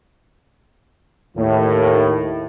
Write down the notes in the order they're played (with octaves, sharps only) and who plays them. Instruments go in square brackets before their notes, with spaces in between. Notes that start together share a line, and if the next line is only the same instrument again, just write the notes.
[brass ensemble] D#2 A2